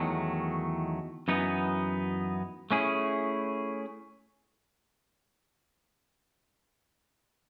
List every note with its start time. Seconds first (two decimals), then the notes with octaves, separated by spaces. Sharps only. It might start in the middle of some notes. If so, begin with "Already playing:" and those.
Already playing: E2 D#3 F#3 A3
1.28 F#2 E3 B3 D#4
2.71 A3 C#4 E4 G#4